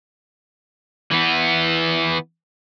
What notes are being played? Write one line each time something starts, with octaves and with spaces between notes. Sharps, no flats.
E3 B3